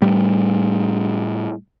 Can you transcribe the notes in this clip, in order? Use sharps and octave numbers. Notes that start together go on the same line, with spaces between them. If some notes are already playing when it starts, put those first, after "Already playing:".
A2 G3